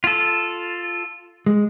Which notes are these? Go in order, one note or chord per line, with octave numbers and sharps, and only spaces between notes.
F4 A4
G#3